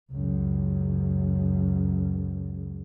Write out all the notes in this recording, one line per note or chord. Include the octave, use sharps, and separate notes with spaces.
C#2 F#2